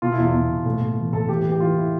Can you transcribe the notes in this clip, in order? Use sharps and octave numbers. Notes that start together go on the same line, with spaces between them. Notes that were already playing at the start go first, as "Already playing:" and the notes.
B2 F4
E4
E2 F4
E2
B2
A2
A2
E3
A2 A4
E3 G4
B4
E3
G4
E3 F4
E4